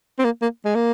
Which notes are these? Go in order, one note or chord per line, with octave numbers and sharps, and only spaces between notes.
C4
A#3
A#3
G#3
A#3